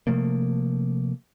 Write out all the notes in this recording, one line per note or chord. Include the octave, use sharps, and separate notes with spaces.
C3 F3 A3 A#3